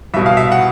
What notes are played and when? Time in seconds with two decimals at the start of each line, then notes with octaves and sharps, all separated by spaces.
0.14 C2 B2 E5
0.26 F5
0.37 E5
0.52 F#5